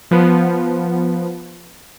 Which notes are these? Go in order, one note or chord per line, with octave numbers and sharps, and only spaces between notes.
F3 B3